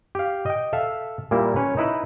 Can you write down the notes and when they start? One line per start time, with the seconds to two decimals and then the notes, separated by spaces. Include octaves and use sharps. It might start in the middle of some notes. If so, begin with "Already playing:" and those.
0.15 G4 F5
0.46 D#5 G5
0.73 A4 E5 F5
1.31 A#2 G3 A#3 E4
1.56 C#4 B4 C#5
1.77 D#4 E4 B4